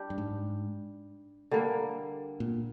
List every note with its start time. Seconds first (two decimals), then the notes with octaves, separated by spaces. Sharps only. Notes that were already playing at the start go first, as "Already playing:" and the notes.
Already playing: G3 D4 G4
0.10 G2
0.18 G#2
1.51 D3 G3 A#3
2.40 A#2